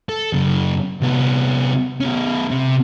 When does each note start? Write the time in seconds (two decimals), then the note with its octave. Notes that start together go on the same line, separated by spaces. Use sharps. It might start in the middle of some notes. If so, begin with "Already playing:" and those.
0.09 A4
0.33 F#2 C#3
1.01 C2 B3
2.00 B2 C#4
2.50 C3